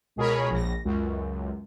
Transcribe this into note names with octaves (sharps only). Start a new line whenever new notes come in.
C#2 B2 G#4 A#4 C#5 B5
A#1 A#6
C#2 F#2